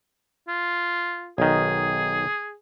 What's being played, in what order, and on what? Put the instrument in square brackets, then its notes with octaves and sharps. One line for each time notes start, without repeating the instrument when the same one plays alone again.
[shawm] F4
[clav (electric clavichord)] B1 D#3 [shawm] G#4